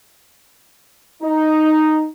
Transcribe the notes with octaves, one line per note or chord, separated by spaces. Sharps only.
D#4